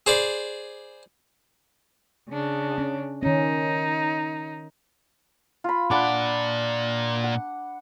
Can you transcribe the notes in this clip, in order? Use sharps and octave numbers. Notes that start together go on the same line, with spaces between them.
G#4 C5 D5 B5
C#3 D4
C#4
D#3 C#4 D#4
F4 B5
A#2 D4 D5 F#5 B5
F#5